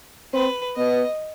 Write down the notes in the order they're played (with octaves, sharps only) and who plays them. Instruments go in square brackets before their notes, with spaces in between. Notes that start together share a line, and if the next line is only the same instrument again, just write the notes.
[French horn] C4 [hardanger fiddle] B4
[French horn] B3 [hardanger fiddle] D#5